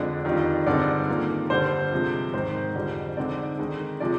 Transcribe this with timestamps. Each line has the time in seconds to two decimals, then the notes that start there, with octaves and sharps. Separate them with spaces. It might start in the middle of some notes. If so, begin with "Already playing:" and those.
Already playing: F2 D3 G#3 D4
0.24 F2 D#3 G3 D4 F4
0.66 G2 D3 G#3 C4 D#4 D5
1.08 D#3 A#3 F4
1.50 G2 D3 G3 C5
1.92 C3 F3 G#3
2.33 G#2 D#3 G#3 C5
2.75 F2 D3 G3
3.17 D3 G#3 C4 D#4 D5
3.59 D#3 G#3 D#4
4.00 C3 F3 G#3 D5